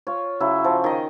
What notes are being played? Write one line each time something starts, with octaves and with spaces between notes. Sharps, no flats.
F4 C#5
C#3 F#3 E4
F3
D#3 D#5